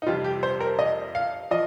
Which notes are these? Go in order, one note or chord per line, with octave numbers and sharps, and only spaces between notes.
D#4
F2 C3 G3 F4
G4
C5
A#4
D#5
F5
F3 D#5